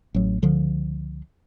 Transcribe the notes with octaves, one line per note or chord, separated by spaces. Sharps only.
A1 F#3
C#2 D3 F3